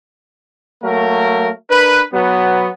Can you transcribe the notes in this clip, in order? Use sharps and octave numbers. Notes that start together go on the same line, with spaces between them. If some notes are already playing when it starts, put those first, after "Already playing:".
F#3 A3 A#3 A#4
D4 A#4 B4
F#3 B3